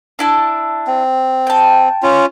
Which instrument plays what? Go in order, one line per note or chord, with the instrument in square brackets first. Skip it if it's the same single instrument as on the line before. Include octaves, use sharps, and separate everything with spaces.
[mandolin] D4 E4 A5
[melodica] C4
[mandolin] G5 A5
[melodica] C#4 F4